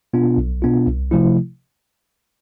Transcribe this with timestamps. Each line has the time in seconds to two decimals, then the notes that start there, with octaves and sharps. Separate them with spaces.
0.13 B2 B3 D4 F4
0.37 B1
0.62 B2 B3 D4 F4
0.87 C2
1.11 C3 F3 A3 E4